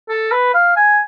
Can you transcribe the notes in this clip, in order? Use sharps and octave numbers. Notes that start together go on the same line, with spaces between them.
A4
B4
F5
G#5